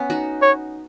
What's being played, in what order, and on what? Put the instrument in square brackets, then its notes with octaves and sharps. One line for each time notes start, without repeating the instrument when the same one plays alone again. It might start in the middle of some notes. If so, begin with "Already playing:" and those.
Already playing: [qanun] B3 C#4
D#4 F#4
[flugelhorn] C#5